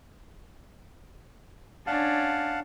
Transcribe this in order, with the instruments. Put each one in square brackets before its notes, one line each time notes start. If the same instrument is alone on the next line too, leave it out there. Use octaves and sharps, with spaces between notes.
[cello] C#4 D4 [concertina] F5 F#5 A5